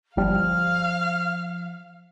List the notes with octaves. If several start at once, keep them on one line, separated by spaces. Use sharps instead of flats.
G1 F3 G3 F5 F6